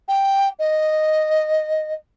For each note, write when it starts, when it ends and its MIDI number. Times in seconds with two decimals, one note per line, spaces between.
0.08 0.48 79
0.59 1.93 75